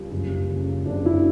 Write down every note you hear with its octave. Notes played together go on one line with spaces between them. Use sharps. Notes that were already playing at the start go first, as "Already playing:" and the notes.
Already playing: C#2 G3
F#1
C#3
F#1 D4
E4